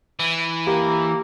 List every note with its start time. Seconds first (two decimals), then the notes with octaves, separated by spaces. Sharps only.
0.19 E3
0.67 A#3 G4